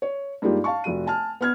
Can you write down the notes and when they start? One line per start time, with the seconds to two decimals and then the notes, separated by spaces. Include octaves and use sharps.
0.02 C#5
0.42 G2 G#3 A#3 D#4 F4 G4
0.64 F5 A5 C#6
0.84 F1 F#4 D#7
1.06 G#5 A5 F6
1.41 B3 F6 G#6